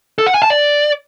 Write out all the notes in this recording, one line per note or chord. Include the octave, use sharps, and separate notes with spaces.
A4
F#5
G#5
A5
D5